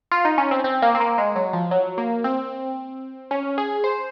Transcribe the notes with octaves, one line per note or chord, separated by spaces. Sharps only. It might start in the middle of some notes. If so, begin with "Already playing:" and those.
F4
D#4
C#4
C4
C4
A#3
C4
A#3
G#3
F#3
F3
F#3
A#3
C4
C#4
G#4
C5